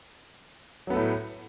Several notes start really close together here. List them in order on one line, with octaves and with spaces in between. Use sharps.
F#3 B3 A3 A2